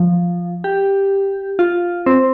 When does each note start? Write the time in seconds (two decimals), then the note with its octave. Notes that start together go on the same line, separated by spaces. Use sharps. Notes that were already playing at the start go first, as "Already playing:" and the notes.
Already playing: F3
0.64 G4
1.59 F4
2.06 C4